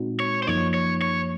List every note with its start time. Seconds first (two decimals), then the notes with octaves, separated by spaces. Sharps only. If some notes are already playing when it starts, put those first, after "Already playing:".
Already playing: A#2 G#3 C4 D#4 F#4
0.20 C#5
0.43 C5
0.47 F#2 F3 A#3 D#4 C#5
0.74 C#5
1.02 C#5